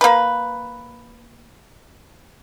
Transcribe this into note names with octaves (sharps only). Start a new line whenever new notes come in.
A#3 B4